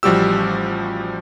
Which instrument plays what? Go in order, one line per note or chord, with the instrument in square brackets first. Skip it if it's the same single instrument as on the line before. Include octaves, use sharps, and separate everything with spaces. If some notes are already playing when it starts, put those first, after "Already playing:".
[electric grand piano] A1 F3 G3 F#4 G4 E6